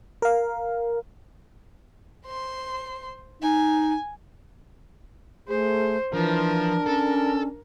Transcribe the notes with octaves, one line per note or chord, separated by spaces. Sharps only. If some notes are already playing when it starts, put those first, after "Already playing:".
A#4 F5
C5 C6
D#4 G#5
A3 G#4 C5
E3 F3 D4 A#4
C#4 A4